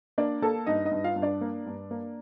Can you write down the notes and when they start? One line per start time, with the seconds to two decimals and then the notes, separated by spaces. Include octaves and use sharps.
0.18 A#3 D4 D5
0.42 A#3 A4 A5
0.66 G2 D#4 D#5
0.85 D#4 D#5
0.91 G2
1.04 F4 F5
1.16 G2
1.22 D4 D5
1.41 A#3
1.66 G2
1.91 A#3